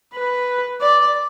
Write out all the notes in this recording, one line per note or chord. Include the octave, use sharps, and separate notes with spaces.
B4
D5